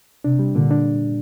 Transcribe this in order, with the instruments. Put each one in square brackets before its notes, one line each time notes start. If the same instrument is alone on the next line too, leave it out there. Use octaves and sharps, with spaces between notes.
[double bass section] C3 [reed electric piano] D4
[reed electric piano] G3
[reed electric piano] A#2 [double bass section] D3
[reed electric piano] D4